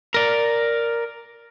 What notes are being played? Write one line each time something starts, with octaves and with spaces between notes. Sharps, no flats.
A#4 D5